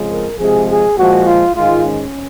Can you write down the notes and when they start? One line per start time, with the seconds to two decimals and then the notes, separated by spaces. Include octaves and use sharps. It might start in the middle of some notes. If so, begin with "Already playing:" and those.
Already playing: F2 C#3 F3 G#3
0.09 A#4
0.39 C3 F3 G#3 G#4
0.68 G#4
0.97 A#2 F3 G#3 F#4
1.26 F4
1.55 G#2 D#3 G#3 F4
1.85 C#4